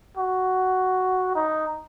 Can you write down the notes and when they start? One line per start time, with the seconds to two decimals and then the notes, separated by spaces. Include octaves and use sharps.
0.17 F#4
1.35 D#4